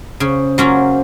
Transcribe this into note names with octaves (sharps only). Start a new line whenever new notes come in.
C#3 C5
F#3 A#3 C#4 F4